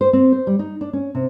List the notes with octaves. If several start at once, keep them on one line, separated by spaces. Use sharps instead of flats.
C5
C4
C5
G3
D#4
D4
C#4
C3